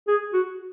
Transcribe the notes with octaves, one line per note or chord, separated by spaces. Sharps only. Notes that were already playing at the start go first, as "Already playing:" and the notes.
G#4
F#4